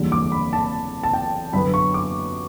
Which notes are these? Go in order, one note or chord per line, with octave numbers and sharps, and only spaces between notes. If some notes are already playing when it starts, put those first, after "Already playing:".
Already playing: F#1 E2 D3 G3
D6
B5
A5
A5
G5
F#2 D3 F#3 B3 B5
C#6
D6